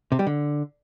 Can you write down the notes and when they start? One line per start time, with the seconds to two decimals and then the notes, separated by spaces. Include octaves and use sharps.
0.12 C3
0.19 G3
0.27 D3